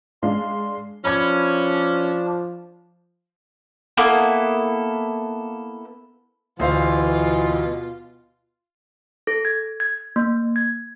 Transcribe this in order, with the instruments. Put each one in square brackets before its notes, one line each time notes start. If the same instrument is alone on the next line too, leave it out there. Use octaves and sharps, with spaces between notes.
[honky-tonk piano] G#3 D4 F5 [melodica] C6
[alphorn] F3 [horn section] C#4 [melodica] D4 [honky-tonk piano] B5 G#6
[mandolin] A#3 B3 E4 A4
[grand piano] D2 C5 F5 [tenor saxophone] B2 [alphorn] E3 [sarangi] F4
[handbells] A4
G#6
G#6
A#3
G#6